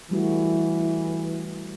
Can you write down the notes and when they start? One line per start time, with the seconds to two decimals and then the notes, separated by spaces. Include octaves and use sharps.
0.11 E3 G3 A3 F#4